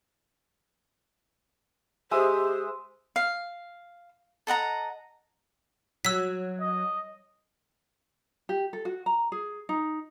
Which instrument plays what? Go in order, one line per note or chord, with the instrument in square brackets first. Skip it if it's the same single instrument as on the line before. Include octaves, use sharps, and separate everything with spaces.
[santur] G#3 E5 D#6 [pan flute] G4 [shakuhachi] C5
[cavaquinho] F5
A4 D#5 F#5 A#5
[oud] F#3 [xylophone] E6 B6
[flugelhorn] D#5
[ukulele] G4
A4
F#4
A#5
G#4
D#4